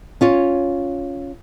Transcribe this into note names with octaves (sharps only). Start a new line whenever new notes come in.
C#4 F4 C#5